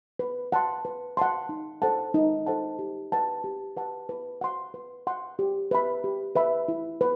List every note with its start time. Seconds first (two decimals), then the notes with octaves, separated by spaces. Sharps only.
0.19 B4
0.52 F#5 A5 C6
0.85 B4
1.17 F#5 A5 C6
1.49 D#4
1.82 A4 C5 F#5 A5
2.14 D#4
2.46 A4 C5 F#5 A5
2.79 G4
3.12 B4 F#5 A5
3.44 G4
3.77 B4 F#5 A5
4.09 B4
4.41 F#5 C6
4.74 B4
5.07 F#5 C6
5.39 G4
5.71 B4 E5 B5
6.04 G4
6.35 B4 E5 B5
6.68 E4
7.01 B4